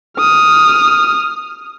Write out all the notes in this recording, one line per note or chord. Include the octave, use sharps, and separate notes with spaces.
D#6 F6